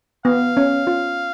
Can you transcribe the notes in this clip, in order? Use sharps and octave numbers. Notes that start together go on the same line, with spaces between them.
B3 F5
C#4
F4